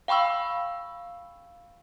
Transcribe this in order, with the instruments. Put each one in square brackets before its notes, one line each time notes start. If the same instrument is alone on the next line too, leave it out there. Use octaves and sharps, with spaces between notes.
[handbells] F5 G5 B5 C#6 E6